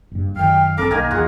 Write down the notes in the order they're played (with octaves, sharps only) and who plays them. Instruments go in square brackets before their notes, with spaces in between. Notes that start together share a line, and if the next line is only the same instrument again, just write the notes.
[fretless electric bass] F#1 G2
[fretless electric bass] F#2 D#3 [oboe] F5 [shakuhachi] G5
[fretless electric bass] G1 C4 [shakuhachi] A4 [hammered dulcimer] A#4 [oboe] D6
[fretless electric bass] B1 [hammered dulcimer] D#3 A#3 [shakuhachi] A#4 [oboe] G#5
[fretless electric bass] E2 [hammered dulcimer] F4 F#5 [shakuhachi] G#4